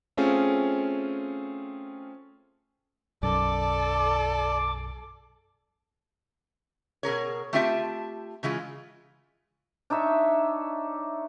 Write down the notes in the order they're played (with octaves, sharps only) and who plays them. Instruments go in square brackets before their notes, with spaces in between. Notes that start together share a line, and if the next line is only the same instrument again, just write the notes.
[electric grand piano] A3 C4 C#4 F4 G#4
[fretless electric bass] B1 F#2 [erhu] A4 [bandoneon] D5 [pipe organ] D6
[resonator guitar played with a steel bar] B2 G#4 A#4 C#5
A3 C4 F4 G4 E5 A5
C#3 E3 G#3 F4
[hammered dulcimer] D4 D#4 C#5 E5